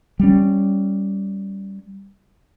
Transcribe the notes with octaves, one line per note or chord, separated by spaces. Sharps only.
G3 C#4